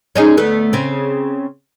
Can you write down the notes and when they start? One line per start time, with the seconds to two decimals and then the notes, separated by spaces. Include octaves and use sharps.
0.16 C#4 D#4 G#4
0.37 D2 A3 B3
0.73 C#3 C4